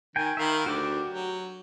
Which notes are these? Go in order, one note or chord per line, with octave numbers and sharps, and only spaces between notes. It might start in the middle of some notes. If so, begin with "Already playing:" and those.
D#3 G5 G#5
D#3 E5 F5 B5
D2 F#4 G4 D6
F#3